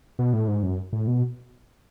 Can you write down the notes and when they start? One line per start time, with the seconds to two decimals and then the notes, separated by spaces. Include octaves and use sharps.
0.19 B2
0.33 A2
0.48 G#2
0.63 F#2
0.93 A2
1.07 B2